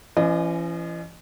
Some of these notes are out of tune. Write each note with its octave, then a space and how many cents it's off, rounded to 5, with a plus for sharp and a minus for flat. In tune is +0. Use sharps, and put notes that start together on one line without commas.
E3 +40 C#4 +0 D#5 -30